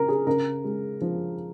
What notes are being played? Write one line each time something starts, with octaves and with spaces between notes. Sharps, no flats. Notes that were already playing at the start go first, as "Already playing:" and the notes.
Already playing: C#3 A#4
G#4
C#3 A#4
G#3
F3